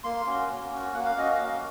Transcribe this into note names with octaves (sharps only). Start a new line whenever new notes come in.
A#3 C6
C#4 F#4
A#3
C#4 F#4
A#3 F#5
F5
C#4 F#4 D#5
F5
A#3